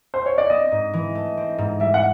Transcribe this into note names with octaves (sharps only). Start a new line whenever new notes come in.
C5
C#5
D5
C4 D#5
G#2
E3
A3
C4
G#2
G3 E5
F#5